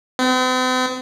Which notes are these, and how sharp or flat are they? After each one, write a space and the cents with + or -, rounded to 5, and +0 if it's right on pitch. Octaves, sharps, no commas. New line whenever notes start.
C4 -45